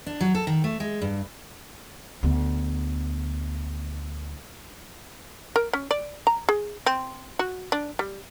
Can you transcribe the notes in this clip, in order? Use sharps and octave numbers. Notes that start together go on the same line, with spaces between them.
D4
F#3
A4
D#3
A3
G#3
G2
D2 B3
A#4
C#4
D5
A#5
G#4
C4
F#4
D4
G3